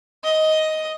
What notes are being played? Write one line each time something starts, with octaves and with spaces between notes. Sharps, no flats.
D#5